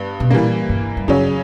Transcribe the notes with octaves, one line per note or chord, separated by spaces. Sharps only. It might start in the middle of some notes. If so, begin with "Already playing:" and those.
Already playing: G2 B3
B2
A#2 E3 G3 A#3
G2
G2
F#2 C#3 F#3 C#4